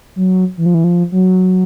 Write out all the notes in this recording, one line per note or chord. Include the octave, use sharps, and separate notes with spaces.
F#3
E3
F3
E3
F3
F#3